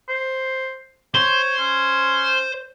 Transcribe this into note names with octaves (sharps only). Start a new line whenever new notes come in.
C5
C5 C#5
C#4